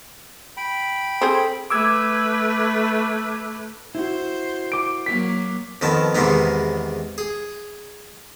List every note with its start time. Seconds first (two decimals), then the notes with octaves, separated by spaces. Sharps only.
0.57 G5 B5
1.21 C4 G#4 A4
1.70 A3 B4 D6 E6 G#6
3.95 E4 F#4 C5
4.72 D6 D7
5.06 F#3 A#3 B6
5.81 F2 D#3 B3 A5
6.15 E2 G#2 C3 D#3 B3 D#4
7.18 G#4